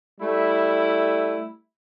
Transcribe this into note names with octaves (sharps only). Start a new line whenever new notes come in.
G3 A3 E4